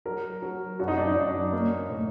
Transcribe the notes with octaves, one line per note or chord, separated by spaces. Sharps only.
F#3 A#4
F#3
F#2 F#4
D#4
D4
D#4
F#2
A#3
A2